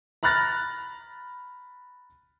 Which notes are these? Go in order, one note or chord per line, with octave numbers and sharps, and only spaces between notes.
A#5 B5 F6 F#6 A6 A#6